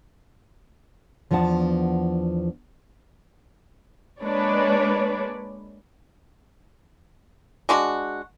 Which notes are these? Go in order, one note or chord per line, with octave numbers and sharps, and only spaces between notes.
E2 F3 B3 D4 F#5 A5
G#3 A#3 D4 B4 C#5 D5
G#3 D4 F#4